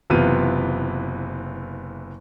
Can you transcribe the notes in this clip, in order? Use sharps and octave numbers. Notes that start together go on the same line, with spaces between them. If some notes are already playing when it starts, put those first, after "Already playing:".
F#1 C3 E3 B3 F4 D#7